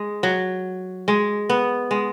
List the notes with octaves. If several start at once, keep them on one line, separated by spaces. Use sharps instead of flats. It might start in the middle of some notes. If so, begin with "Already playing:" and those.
Already playing: G#3
F#3
G#3
B3
G#3